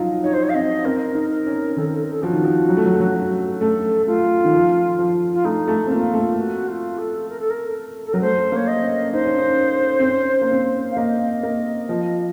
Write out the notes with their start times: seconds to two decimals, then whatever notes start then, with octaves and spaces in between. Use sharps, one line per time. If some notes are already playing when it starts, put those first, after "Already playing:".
Already playing: F3 F#3 D#4 F4
0.23 D#4 C#5
0.33 C5
0.43 C#5
0.49 F5
0.54 C4 D#5
0.85 C4 A#4
1.15 D#4
1.31 A#4
1.46 C#4
1.77 D#3 A4
1.85 A#4
1.94 A4
2.02 A#4
2.11 A4
2.23 F3 F#4
2.33 D#3
2.44 F3
2.69 F#3
2.77 A3
2.85 F#3
2.93 A3
3.00 F#3
3.16 F#3
3.60 A3 A4
4.07 A3 F4
4.45 D#3
4.53 F3
4.99 F3
5.33 F4
5.45 A3 D#4
5.68 A3
5.87 C4
5.91 A#3 F4
6.14 A3
6.37 F#4
6.68 F4
6.98 A4
7.29 A#4
7.40 A4
7.50 A#4
8.05 A4
8.13 F#3 A#4
8.21 A3 C5
8.52 A#3 C#5
8.67 D#5
8.82 C#4
9.13 D#4 C5
9.25 C#4
9.38 D#4
10.00 C4
10.05 C#4
10.41 A#3
10.52 C4
10.91 F5
10.97 A#3 D#5
11.43 A#3
11.89 F3